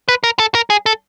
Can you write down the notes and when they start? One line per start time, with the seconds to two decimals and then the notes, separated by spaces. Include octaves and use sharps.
0.09 B4
0.24 A#4
0.39 A4
0.55 A#4
0.70 G#4
0.86 A4